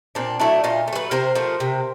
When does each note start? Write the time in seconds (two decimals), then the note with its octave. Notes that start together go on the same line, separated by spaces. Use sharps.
0.15 A#2 C4 D4
0.40 F#3 A3 D4 E4
0.64 A#2 D#4 F4
0.88 A3
0.93 F#3 A4 B4
1.11 C3 A#4 C5
1.35 F3 A3
1.60 C3